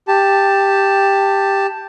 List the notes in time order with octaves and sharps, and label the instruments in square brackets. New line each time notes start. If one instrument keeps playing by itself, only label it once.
[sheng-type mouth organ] G4 A5